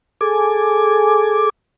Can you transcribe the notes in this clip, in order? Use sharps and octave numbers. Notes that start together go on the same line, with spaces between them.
G#4 A4 G#5 D6